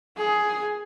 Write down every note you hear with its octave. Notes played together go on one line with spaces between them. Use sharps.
G#4